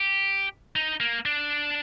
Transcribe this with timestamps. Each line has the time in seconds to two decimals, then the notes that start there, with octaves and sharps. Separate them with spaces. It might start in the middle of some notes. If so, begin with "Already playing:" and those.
Already playing: G4
0.76 D#4
1.00 A#3
1.26 D4